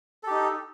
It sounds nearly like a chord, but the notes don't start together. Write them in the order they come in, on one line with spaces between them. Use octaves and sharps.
A4 G4 D#4